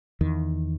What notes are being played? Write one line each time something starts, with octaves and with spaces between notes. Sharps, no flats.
E2 D#3